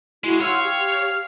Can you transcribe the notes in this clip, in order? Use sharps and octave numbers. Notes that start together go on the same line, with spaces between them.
G#3 E4 F#4
C#5 F5 F#5 C6 E6
G4